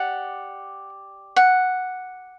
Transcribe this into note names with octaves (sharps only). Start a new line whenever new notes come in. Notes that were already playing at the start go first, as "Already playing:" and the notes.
Already playing: G4 D5 F#5
F#5